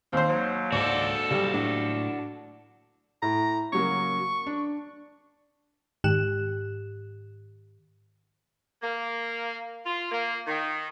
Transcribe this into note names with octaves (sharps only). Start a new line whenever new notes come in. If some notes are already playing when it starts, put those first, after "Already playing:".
D#2 C4 C5
F#3
C#2 G#2 F#4 A4 D5
C#3 F#3 G3 G4
A2 F#3 D4
A2 A#5
C#3 F#3 A#3 C#6
D4
G#2 D#3 G4 F#6 E7
A#3
F4
A#3
D#3